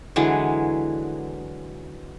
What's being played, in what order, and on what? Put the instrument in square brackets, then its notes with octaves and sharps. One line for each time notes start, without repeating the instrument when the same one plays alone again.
[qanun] D3 E3 F#3 G#3